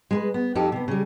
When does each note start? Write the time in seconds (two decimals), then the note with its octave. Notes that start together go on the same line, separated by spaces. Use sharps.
0.11 G#3 A#4 B4
0.34 B3
0.55 F2 D#4 G4 A4
0.72 C3 B3
0.88 C#3 G3